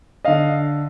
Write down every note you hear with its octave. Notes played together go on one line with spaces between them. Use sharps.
D3 D#5 F5